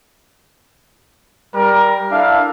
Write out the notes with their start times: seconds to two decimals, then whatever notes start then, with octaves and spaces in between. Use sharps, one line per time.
1.55 G3 A#4
2.11 D4 E4 A4 E5 F5